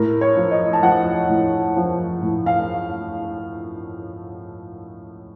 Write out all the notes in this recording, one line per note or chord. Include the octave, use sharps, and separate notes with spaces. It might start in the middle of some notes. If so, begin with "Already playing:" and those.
Already playing: A2 A#4
C#5
F3
D#5
A5
F3 F#5
A2
F3
A2
F5